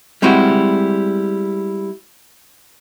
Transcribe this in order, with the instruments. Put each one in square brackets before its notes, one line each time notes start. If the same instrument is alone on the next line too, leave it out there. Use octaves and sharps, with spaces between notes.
[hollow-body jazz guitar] G3 G#3 C4 E4 F#4